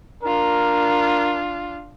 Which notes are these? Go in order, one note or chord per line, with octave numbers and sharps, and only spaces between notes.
D4 F4 A#4